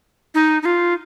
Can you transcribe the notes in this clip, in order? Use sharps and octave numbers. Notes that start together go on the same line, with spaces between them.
D#4
D#4
F4